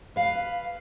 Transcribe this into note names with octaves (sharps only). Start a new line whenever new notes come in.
B4 F5